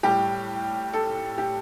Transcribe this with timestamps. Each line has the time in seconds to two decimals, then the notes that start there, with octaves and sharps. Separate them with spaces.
0.03 A2 G3 G4
0.93 A4
1.38 G4